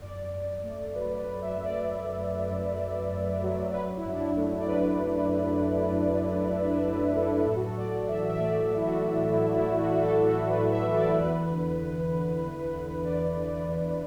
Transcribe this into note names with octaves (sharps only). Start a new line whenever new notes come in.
F#2 D5
F#2
A3
F#3 B4
B4
F#3
E5
F#2
D5
F#2
F#2
F#2
F#2
F#2
F#3
F#3 B4
E4
F#2
D4
E4
A3
D5
F#3 B4
F#2
F#2
F#2
F#2
A3
F#3 E5
E5
F#3 D5
F#3 A4
A2 A4
F#4
A4
A2 D5
E3 E5
E5
A3 D5
A2
E4
F#4
A2
A2 E4
E4
A3
F#4
A3 F#4
A4
A3 F#4
B4
A2
E5
E3
D5
E2 B4
D3
E2
D3
D3
D3
B4
D3 D5
D3
D5
E2